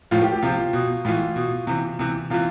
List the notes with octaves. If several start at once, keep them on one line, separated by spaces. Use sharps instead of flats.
A2 F3 F4
G4
G4
C3 F3 F4
B2
A2 E3 F4
B2
C3 E3
C3 E3
C3 E3 F4